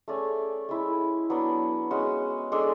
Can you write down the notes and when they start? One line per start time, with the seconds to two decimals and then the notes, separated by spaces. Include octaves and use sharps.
0.08 A3 C#4 G#4 D5
0.69 G#3 C#4 E4
1.30 F#3 B3 D4
1.91 G#3 C#4 F#4
2.52 G#3 D4 A4 D5